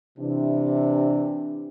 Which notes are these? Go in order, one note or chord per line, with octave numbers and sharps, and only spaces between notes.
C3 E3 D4